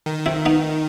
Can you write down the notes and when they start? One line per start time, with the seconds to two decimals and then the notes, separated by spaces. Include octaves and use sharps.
0.06 D#3
0.26 C4 E4
0.46 B3 D#4